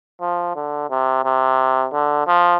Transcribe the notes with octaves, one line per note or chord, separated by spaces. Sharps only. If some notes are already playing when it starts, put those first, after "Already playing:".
F3
D3
C3
C3
D3
F3